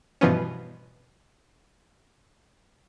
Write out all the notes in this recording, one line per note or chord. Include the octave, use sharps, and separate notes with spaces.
G2 B2 E3 F3 B3 C#4